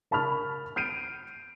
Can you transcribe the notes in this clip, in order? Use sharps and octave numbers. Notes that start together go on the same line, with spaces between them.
A#4 A5 B5 C#6 F6
F6 G6 C7 D7 D#7